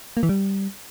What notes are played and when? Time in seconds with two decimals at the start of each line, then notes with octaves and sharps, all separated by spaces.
0.17 A#3
0.23 E3
0.29 G3